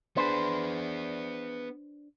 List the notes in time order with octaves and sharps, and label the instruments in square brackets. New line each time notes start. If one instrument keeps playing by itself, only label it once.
[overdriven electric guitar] B3 G#4 [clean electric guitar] D4 B4 C5